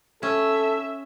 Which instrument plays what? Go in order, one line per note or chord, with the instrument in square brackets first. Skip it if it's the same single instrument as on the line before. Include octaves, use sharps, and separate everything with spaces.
[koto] C#4 [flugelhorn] A4 [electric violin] E5